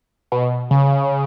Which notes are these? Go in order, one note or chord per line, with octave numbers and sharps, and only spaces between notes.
B2
C#3